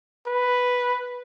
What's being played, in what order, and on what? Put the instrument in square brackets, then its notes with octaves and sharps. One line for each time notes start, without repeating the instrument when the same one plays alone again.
[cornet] B4